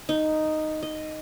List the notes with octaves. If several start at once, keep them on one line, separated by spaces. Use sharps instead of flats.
D#4
D#5